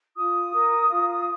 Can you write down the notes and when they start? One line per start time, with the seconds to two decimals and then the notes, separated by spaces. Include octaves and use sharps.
0.17 F4 D#6
0.52 A#4
0.88 F4